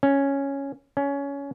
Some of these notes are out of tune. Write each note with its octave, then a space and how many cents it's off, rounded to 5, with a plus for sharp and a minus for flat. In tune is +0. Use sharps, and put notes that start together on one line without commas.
C#4 +0
C#4 +20